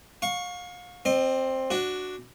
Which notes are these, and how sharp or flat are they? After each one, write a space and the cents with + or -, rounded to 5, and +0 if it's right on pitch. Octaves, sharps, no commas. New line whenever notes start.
F5 +35 C#6 +0
C4 +10 D#5 -40
D4 +0 F#4 +0